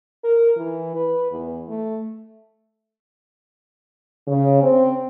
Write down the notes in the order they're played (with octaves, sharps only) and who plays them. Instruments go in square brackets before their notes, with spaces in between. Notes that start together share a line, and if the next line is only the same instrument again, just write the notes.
[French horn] A#4
E3
B4
E2
A3
[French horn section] C#3
C4